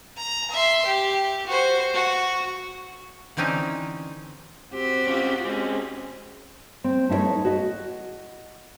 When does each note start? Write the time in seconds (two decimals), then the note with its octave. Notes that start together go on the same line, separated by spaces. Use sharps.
0.17 A#5
0.51 E5 C6
0.85 G4
1.47 F#4 C5
1.94 F#4
3.37 D3 E3 C4 C#4 D#4
4.73 C4 F#4 G4
5.07 C#4 F4
5.45 G#3 C4 C#4
6.84 C4
7.09 A3 D#4 E4 B4 C#5
7.45 F#4 D#5